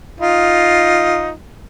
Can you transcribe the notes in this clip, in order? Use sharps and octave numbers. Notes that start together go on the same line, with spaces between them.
D#4 F4